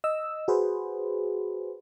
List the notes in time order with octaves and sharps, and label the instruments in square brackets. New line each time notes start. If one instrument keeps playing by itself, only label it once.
[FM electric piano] D#5 E6
F#4 G#4 B4 C5